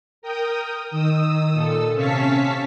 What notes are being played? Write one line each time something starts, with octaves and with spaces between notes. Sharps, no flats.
A#4 G5 D#6
D#3 D#6 E6
A#2 A4 E6
C3 C#4 F5 A5 C#6 B6